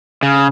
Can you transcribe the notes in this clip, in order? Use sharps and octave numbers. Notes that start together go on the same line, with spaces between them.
C#3